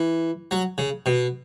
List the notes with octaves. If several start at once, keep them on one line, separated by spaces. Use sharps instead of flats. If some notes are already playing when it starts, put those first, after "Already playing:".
Already playing: E3
F#3
C#3
B2